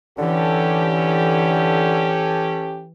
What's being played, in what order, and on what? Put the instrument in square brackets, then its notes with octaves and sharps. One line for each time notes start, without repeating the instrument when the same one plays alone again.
[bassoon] D3 [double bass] E3 [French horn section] C#4 G4 A4